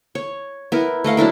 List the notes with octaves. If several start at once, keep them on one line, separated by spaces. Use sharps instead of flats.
C#5
B3 E4 A#4
A3 D#5 F5 F#5
F#3 D4 E4 A#4